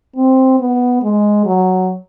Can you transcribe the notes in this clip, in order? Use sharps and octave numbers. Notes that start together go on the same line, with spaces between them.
C4
B3
G#3
F#3